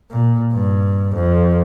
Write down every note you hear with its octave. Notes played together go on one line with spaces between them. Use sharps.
A#2
G2
F2